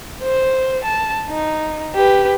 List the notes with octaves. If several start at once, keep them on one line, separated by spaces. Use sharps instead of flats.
C5
A5
D#4
G4 B4